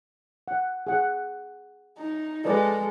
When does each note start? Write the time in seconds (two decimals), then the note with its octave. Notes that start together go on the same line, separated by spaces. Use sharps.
0.48 F#5
0.87 G#4 F#5
1.98 D#4
2.45 G#3 A4 B4 D5 D#5